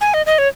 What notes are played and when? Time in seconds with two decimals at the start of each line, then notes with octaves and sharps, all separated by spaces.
0.01 G#5
0.14 D#5
0.26 D#5
0.38 C#5